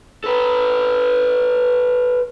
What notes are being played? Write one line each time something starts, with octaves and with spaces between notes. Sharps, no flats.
A4 B4